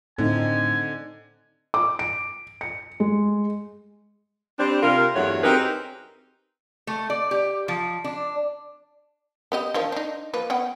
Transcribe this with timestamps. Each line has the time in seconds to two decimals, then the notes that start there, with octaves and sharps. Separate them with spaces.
0.18 A2 D3 C4 D#4 G#5
1.74 D6
1.99 D7
2.61 C#7
3.00 G#3
4.59 G3 C4 D4
4.83 C3 F4 A#4
5.15 E2 G2 F#3 A3 F#4 C#5
5.43 C4 D#4 G4 G#4 A#4 B4
6.87 A3
7.10 D5
7.31 G4
7.68 F3
8.04 D4
9.52 B3 G4 D#5
9.74 D#3 F3 D4
9.92 D4 D#4
10.34 F3 A#3 B4
10.50 B3 F#5 G5